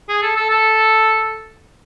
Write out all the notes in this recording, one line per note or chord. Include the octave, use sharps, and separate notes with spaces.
G#4
A4
A4
A4